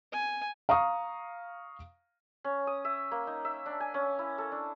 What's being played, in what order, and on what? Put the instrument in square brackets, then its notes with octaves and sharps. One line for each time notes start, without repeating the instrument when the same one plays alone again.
[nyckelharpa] G#5
[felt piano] F5 A#5 C#6 D#6
[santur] C#4
D#6
E5
A#3
D#4
E5
D4
G#5
C#4
E4
A4
D4